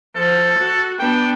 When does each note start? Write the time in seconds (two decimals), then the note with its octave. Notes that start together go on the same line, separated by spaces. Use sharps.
0.16 F3 A4
0.59 F#4
0.99 B3 D4 G5